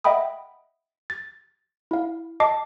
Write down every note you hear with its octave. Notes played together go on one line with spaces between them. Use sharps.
D#5 E5 F#5 G5 B5 D#6
A6
E4 F5
D#5 A5 D6 C7